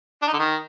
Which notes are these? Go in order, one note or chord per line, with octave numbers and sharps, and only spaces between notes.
D4
D#4
D3
D#3